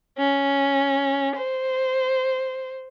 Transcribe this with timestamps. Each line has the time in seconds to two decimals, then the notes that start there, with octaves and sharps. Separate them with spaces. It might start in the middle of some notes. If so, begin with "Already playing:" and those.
0.18 C#4
1.37 C5